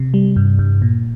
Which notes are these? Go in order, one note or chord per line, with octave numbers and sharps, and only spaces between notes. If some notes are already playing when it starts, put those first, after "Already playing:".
Already playing: C3
G3
G2
G2
A#2